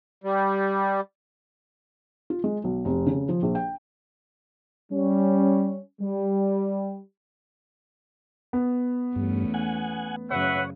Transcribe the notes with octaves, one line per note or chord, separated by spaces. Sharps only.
G3
F4
G#3
B1
F1
C#3
F3
A#1
G5
G3 C#4
G3
B3
E2 G2 A3 C#4
F#5 G#5
F#2 C#3 B4 C#5 E5 F#5